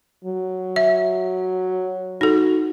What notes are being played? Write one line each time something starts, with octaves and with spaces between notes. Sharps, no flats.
F#3
E5
D#4 F#4 A4